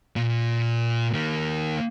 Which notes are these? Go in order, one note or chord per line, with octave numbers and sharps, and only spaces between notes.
A#2
D#3 A#3